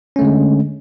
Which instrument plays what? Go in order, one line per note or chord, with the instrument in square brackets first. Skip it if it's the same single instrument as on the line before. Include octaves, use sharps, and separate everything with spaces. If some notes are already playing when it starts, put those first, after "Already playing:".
[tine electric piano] C#4
A3
D3
G#3